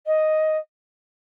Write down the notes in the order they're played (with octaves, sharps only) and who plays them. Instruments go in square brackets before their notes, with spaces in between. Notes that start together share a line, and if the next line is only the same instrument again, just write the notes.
[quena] D#5